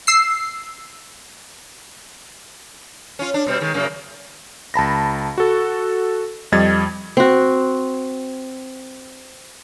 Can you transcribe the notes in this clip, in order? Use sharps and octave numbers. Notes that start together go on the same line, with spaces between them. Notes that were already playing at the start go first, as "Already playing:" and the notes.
E6 C7
C#4 F4
D4
B2 G3 C4
D#3 G#3
F#2 C#3 A#3
C#2 A5 B5 A#6
F#4 A4
F2 G3 D#5 G#6 A6
C4 F#4